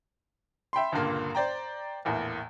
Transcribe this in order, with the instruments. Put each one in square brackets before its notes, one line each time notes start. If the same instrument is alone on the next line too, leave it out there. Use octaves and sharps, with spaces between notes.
[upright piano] E5 G5 B5 C6
C#2 G2 A#2 D3 A#3
C5 D5 G5 A#5
A#1 E2 A2 A#3